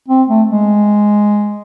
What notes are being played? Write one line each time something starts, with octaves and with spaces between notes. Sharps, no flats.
C4
A3
G#3